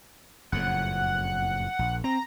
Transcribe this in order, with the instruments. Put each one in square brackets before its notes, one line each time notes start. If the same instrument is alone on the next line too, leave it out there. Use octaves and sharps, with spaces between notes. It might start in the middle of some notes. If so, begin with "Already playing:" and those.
[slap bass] F#1 F2 A2 [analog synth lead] F#5
[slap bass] A#1
[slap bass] C4 [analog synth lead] A#5